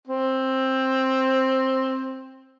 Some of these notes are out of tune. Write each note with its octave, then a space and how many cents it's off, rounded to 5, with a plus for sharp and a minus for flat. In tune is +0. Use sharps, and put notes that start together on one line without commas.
C4 +10